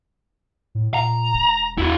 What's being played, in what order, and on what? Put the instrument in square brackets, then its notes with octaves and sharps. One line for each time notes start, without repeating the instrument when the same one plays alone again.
[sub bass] A2
[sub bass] A#2 [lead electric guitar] A#5
[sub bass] E1
[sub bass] E2 [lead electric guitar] E4 F#4